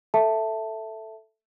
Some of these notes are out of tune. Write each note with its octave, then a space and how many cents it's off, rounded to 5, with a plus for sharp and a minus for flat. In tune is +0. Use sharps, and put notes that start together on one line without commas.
A4 +0 E5 +0 A5 +5